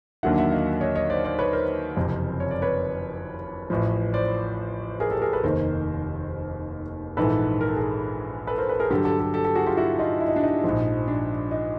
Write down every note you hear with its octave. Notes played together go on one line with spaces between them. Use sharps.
D#2 D3 F#3 A#3 D4 E5 F#5
E5 F#5
D#5 F5
C#5 D#5
C#5 D#5
C5 D5
C5 D5
B4 C#5
A#4 C5
F#1 F2 C3
C#5
D5
B4 C#5
A1 A2 F3
C5 D5
G#4 A#4
G4 A4
G#4 A#4
A4 B4
F1 D#2 D#3 A#4 C5
A#1 G#2 E3 A4 B4
A#4
A4
G#4 A#4
A4 B4
A#4 C5
A4 B4
G#4 A#4
G2 D3 F#3 G4 A4
G4 A4
G4 A4
G4 A4
G4 A4
F#4 G#4
F4 G4
E4 F#4
D#4 F4
E4
D#4
D4
D#4
A#1 G#2 F3
D4
D#4